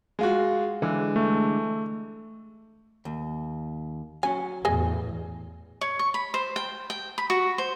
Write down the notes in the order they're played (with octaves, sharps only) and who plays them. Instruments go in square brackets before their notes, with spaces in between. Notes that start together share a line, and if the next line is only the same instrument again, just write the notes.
[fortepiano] G#3 F4 F#4
[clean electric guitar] D3 G#3 [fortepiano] E3
[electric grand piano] A3
[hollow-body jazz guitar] D#2
[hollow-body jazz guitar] F#3 C#4 [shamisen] G#5
[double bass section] E2 A2 [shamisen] G#4 D#5 G#5
[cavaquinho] C#5
C#6
B5
C5
G5
G5
B5
F#4
C5